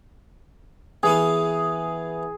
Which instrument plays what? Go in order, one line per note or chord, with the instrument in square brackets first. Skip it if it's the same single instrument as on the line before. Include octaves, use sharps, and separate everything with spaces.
[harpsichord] E3 B3 F5 [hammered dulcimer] G#4